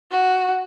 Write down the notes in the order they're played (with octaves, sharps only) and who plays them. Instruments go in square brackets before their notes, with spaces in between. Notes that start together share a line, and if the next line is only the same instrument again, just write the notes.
[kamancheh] F#4